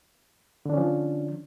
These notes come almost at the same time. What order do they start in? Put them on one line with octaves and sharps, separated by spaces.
D3 D4 C#4 F3